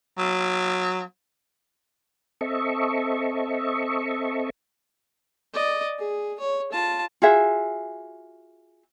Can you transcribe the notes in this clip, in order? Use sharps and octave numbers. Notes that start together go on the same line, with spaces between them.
F#3
C4 A4 D#5 E5 C#6
D5 D#5
G#4
C#5
F4 A5
F4 F#4 G#4 E5